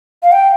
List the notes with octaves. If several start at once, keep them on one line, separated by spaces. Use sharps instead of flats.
F5
G5